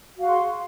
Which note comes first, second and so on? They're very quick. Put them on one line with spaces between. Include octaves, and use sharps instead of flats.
F#4 F5 G#4 C6